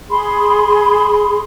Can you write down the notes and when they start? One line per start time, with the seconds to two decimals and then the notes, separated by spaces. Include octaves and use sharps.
0.09 G#4 B5 C6